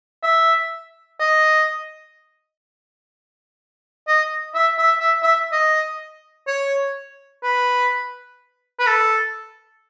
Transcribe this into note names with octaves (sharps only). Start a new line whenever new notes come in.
E5
D#5
D#5
E5
E5
E5
E5
D#5
C#5
B4
B4
A4